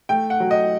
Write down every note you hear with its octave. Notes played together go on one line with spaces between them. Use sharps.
A3 G5
F#5
F#3
D#5